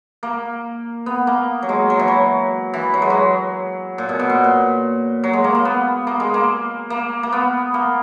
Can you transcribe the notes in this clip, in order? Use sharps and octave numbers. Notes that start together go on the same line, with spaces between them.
A#3
B3
A#3
F#3
G#3
F#3
E3
F#3
E3
F#3
G#3
F#3
A#2
B2
B2
A#2
A#2
F#3
G#3
A#3
A#3
B3
A#3
G#3
A#3
A#3
A#3
B3
A#3